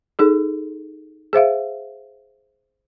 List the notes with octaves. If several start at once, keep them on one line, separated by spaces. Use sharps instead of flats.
D#4 G#4 A4
G#4 C5 E5 F5